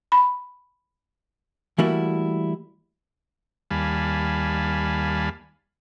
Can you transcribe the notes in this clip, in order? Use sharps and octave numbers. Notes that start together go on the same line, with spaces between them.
B5
E3 G3 A3 A#3 E4 F#4
D#2 G3 F5 G#5 A5 B5